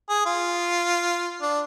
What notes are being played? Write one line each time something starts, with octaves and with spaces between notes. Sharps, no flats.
G#4
F4
D4